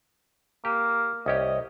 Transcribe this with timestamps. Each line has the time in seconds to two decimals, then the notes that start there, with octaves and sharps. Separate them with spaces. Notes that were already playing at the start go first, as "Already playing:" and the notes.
0.65 A#3 G4
1.26 C2 C#4 G4 D#5